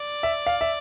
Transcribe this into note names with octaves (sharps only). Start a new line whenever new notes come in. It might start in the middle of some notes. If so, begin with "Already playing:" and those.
Already playing: D5
E5
F5
E5